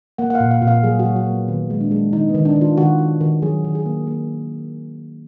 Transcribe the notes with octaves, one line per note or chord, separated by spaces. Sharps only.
A#3 F#5
F#5
F5
A#2
F5
A#2
F5
F#3 G#4
F#4
F#3
F#4
A#3
B3
D#3 B3
G#3
D4
G#3
D#3 D#4
B3
D#3
D4
D#3
F4
D#3 F#4
D#3
D#3
F#3 G#4
D#3
G#4
A#3
A#3 G#4